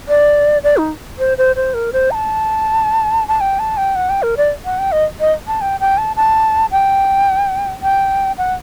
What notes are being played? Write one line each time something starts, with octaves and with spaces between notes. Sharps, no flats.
D5
D5
D#4
C5
C5
C5
A#4
C5
A#5
A5
A5
G5
A5
G5
F#5
G5
A#4
D5
F#5
G5
D#5
D#5
A5
G5
G5
A5
A5
G5
G5
F#5